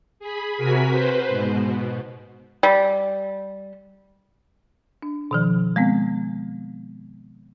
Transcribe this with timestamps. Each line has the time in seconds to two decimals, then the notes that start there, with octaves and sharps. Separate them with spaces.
0.20 G#4 B5
0.56 C3 F#4 A#4 G#5 B6
0.89 B4 C5
1.28 G#2 B2
1.60 B2
2.63 G3
5.02 D4
5.31 B2 D#3 F3
5.76 G#3 B3 C4